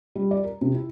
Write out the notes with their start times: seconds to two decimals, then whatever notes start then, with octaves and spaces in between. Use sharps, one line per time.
0.16 G3
0.31 D5
0.44 A#4
0.61 C3
0.74 E4